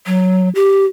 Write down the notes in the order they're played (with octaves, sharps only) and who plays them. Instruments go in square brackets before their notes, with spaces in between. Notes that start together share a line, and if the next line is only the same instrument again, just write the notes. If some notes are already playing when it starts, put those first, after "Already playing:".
[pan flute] F#3
G4